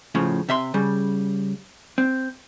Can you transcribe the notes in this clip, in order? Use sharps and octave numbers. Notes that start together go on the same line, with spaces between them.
A2 C#3 F3
C3 E5 C6
C#3 G3
C4